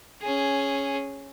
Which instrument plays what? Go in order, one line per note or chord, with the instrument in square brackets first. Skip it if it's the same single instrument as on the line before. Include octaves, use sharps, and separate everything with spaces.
[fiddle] C#4 G#4